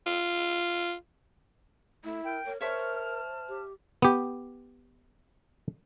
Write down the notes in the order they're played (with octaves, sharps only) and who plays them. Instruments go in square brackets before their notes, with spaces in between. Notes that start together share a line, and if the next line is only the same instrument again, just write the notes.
[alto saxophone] F4
[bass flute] A3 [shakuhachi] E4
[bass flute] A#4 [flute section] G5
[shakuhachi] A#4 [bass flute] C#5
[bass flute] A#4 [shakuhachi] C5 [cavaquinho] C#5 E5 C#6 [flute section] A5 F6
[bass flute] G4
[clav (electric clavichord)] B3 G4